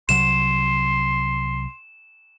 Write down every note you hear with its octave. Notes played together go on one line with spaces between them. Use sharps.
C2 C3 F#3 C6 E7